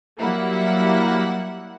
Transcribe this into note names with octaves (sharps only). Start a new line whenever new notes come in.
F#3 G3 A#3 E4 F#5